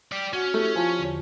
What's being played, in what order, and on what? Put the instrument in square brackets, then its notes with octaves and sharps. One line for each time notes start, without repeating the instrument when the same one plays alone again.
[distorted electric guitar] G4 D5
[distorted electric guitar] C#4 [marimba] F#4 F#5
[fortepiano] A3 [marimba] E4 G4
[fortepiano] F3 [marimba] G#5 A5 C#6
[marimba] E2 D3